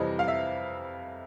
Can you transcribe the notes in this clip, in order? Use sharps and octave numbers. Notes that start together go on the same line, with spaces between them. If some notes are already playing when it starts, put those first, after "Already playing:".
Already playing: F2 C3 E3 G3 D#5
F5
E5